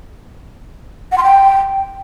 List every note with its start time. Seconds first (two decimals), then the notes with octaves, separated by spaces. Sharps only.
1.12 F#5
1.18 C6
1.23 G5